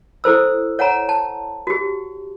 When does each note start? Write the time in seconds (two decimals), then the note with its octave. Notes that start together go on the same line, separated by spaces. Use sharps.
0.24 E4 A4 C5 E6
0.79 C#5 F#5 G#5 A#5
1.09 A5
1.67 F#4 G4